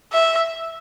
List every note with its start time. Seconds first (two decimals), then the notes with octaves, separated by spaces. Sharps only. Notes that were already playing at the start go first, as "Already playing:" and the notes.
0.13 E5